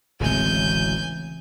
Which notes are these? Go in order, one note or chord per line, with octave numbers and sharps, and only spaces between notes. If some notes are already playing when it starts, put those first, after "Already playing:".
D1 A1 C#3 E3 G#3 C4 G#5 G6